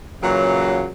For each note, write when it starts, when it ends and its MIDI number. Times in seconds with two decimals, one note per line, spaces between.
0.22 0.89 46
0.22 0.89 49
0.22 0.89 52
0.22 0.89 54